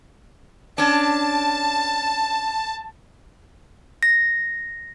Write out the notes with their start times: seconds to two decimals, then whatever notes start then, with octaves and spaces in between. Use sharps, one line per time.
0.78 C#4 D4 A5
4.03 A#6